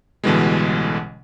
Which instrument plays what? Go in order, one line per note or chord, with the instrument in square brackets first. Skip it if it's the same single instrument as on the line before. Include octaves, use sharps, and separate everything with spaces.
[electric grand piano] A1 B2 D3 E3 G3 G#3